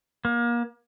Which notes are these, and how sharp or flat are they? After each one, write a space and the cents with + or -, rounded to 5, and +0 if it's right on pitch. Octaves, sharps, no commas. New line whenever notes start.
A#3 +30